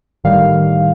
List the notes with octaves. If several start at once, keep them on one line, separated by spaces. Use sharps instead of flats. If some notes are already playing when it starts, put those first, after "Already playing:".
G1 A2 D#3 G3 F5